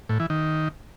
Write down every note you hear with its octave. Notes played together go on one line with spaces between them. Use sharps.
A2
E3
D#3